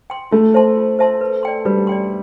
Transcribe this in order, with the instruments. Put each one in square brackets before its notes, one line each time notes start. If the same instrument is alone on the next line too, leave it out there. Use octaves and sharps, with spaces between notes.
[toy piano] G5 C6
[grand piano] A3 [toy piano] F4
[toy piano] C5 E5 A5 C6
F4
C5 E5 A5 C6
B4
D5 G5 C6
[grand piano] G3 [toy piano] B4
[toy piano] D5 G5 C6